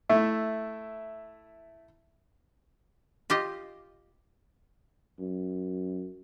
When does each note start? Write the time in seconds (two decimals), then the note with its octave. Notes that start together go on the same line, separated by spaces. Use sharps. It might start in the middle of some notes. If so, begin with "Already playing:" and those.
0.09 A3 E4
3.30 F4 G4 D#5
5.20 F#2